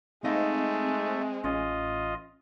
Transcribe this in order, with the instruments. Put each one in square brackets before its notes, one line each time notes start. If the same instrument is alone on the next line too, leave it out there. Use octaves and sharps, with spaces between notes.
[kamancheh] G#3 [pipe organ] A3 [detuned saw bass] C4 [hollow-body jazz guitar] D#4 D#5 F5
[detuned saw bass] A1 [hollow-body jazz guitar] C#4 [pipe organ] F4 D#5